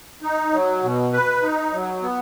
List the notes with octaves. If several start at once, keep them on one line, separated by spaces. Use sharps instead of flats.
D#4
F#3
B2
B4
D#4
F#3
B3